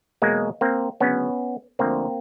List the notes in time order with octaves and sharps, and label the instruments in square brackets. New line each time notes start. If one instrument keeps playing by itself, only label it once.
[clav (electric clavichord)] E2 B2 F#3 G#3 A#3
A#3 C4
D2 C#3 F#3 B3 C#4
D2 D3 F3 A#3 C4